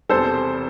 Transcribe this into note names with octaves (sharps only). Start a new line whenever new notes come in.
E1 E2 C3 G3 A4 C5